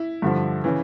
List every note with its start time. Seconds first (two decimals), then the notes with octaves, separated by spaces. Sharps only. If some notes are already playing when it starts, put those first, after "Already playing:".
Already playing: E4
0.22 G2 D3 F3
0.64 C#3 E3